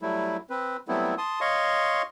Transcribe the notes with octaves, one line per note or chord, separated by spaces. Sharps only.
F#3 G3 A3 E4
C4 B4
F#3 G3 A3 B3 C4 E4
A5 C6 D#6
C#5 D#5 F5 C6 C#6